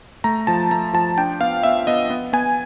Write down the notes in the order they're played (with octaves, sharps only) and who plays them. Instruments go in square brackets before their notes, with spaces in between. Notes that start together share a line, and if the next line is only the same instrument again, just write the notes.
[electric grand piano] A3 A#5
F3 A5
A3 A#5
F3 A5
D4 G5
B3 F5
B3 E5
B3 D#5
B3
B3 G#5